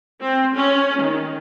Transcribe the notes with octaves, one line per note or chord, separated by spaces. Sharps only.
C4
C#4
D#3